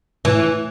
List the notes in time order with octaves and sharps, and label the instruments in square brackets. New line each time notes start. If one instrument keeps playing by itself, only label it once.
[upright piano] A2 [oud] E3